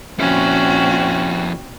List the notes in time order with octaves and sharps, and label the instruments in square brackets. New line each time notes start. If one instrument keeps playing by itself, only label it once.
[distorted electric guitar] F2 E4 [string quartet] A#2 C4 F#4 [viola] C#4